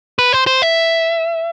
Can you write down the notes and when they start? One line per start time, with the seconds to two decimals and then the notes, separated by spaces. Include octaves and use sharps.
0.19 B4
0.33 C5
0.47 C5
0.62 E5